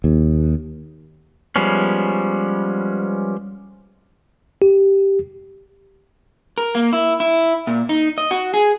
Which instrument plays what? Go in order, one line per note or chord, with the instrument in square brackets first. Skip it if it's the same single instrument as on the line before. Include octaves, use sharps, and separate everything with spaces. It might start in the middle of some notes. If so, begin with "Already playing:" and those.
[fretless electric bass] D#2
[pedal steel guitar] F3 G3 G#3 B3 C#4
[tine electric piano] G4
[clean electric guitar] A#4
A#3
E4
E4
A#2
D#4
D#5
F#4
G#4